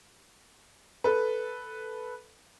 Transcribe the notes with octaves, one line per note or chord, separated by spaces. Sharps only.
A4 B4